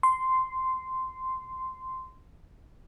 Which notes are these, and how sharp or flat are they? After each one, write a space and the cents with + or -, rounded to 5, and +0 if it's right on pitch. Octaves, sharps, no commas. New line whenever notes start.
C6 -10